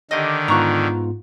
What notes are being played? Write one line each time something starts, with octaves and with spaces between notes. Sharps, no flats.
D3 D#3 G4 D#5
G#2 B3 F4 A#5 C#6 F#6